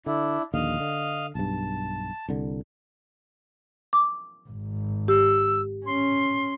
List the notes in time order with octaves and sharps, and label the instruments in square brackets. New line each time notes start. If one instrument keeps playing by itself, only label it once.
[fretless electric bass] D3 [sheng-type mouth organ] D4 E4
[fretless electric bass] A#1 D#2 D3 [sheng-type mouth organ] D#5 F5
[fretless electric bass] D3
[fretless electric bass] B1 G2 [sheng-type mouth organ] A5
[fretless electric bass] C2 D3
[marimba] D6
[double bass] G#1
[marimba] G4 [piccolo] E6
[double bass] C#4 [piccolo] C6